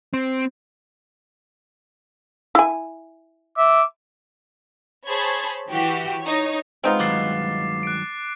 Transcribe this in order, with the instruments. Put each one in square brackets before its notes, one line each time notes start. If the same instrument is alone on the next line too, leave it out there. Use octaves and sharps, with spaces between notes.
[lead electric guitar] C4
[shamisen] E4 G#5
[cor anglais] E5 [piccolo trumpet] D6
[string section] G#4 C5 C#5 A5 B5 G#6
E3 F#4 G4
D#4 C#5
[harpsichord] G#3 B3 [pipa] C4 D#4 F4
[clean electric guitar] G2 D#3 F#3 [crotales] D6 A6 C7
[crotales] F#6 D7